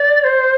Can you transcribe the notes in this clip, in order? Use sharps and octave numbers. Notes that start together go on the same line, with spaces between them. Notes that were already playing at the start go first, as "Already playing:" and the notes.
Already playing: D5
C5